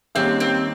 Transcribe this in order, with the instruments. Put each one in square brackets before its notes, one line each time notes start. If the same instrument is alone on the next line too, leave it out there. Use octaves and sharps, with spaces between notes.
[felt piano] D#2 D#3 G3 C#4 G4 [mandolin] C4
[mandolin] C4